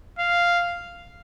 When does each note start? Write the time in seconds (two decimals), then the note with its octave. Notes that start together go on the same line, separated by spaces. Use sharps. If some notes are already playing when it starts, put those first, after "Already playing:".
0.19 F5